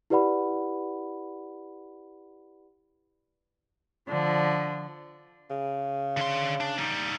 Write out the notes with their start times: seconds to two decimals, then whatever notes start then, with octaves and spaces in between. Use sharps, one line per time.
0.10 E4 G4 B4 D5 F#5 B5
4.09 D3 F3
5.50 C#3
6.17 D3 C6
6.60 D4
6.78 G3 D#4